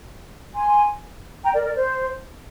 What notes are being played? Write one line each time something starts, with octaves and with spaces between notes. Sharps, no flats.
G#5 C6
G5 A#5
A#4 D5
A#4 D5
C5